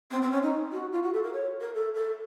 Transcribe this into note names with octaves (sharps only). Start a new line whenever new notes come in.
C4
C4
C#4
D#4
F#4
F4
F#4
A4
A#4
C#5
A#4
A4
A4